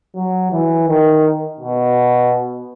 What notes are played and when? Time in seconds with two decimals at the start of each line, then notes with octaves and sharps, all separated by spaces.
0.16 F#3
0.52 E3
0.88 D#3
1.60 B2